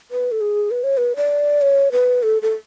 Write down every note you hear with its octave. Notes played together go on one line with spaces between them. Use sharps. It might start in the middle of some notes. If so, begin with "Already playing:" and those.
B4
A4
G#4
B4
C#5
B4
D5
C#5
B4
A4
A4